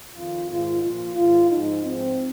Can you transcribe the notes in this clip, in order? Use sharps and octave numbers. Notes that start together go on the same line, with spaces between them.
F2 D#3 F4
G#2 D#3 F4
A#2 F3 F4
G#2 D#3 F4
G#2 F3 D#4
G#2 F3 C4